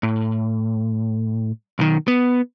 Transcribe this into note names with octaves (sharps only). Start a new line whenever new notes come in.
A2
B1 D#3
B3